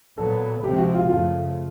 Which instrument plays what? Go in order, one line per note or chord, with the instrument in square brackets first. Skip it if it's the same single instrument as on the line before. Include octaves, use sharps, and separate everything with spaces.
[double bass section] A#2 F#3 B3 [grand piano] A4
[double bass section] C3 F3 G#3 C4 [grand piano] G4
[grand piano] F#4
F4
[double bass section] F#2 C#3 F3 A3 [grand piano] F4